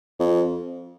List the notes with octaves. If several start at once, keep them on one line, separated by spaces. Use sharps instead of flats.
F2